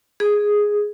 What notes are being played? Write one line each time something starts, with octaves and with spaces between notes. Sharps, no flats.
G#4